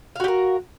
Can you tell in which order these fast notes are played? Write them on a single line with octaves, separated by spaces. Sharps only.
F5 F#4 G4 A#4